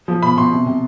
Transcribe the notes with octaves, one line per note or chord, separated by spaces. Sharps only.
F3
B2 B5
B2 C6
C3
C3